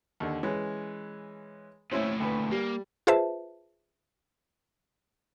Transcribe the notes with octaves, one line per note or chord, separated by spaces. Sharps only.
D#2 D3
E3 G#3 C#4
D#2 A2 C#4 E4 C5
D2 B4
G3 A#3
F4 G#4 B4 C5 E5 A5